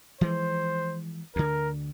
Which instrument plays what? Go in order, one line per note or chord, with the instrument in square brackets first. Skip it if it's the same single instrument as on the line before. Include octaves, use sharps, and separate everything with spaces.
[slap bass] E3 F3 G#3 [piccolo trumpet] C5
[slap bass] D2 D3 [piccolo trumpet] A#4